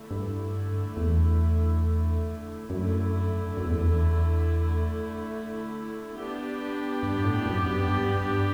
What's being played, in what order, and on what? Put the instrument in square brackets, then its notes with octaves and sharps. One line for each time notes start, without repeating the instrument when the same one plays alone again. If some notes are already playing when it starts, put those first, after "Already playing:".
Already playing: [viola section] D3 A3 E4
[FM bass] G2
E2
[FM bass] F#2 [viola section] D3 A3 E4
[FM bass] F#2
E2
E2
[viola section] B3 D4 G4
[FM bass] G2
A2
F#2
F#2
G2
G2